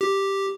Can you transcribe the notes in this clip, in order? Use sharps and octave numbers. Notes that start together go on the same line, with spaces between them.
G4